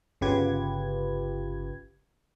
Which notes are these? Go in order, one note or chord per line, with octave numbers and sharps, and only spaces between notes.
G1 C#3 F4 G4 B4 G#6